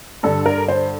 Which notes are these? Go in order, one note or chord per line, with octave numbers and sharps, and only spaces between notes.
G2 D3 A4
A#4
C5